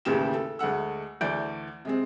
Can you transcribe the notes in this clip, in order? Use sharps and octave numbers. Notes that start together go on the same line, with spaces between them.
A1 D#2 C#3 G4 E7
A4
D2 G#3 A3 F#5 E6
D2 E3 D5 G6 D7
C3 G#3 C4